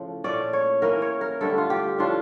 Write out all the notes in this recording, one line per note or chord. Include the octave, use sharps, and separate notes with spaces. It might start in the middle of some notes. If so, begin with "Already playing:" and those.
Already playing: A2 C#3 F3
A#2 A3 C#4 D5
C#5
E3 A#3 C#4 A#4
C#5
A#4
G2 D3 A3 D4 A4
F4
G4
A2 F3 A3 D4 F4